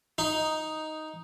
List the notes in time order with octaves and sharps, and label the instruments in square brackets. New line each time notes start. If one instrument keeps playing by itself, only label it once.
[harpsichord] D#4